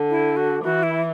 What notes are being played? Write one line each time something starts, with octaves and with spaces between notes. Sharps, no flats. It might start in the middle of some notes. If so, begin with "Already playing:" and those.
Already playing: D3
E4
F#4
E3 F#4
E4